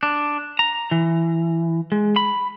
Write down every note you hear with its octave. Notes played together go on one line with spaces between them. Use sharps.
D4
A#5
E3
G#3
B5